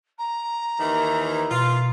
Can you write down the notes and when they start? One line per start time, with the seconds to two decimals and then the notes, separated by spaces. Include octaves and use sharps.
0.18 A#5
0.80 D#2 D#3 E3
1.51 B2 F4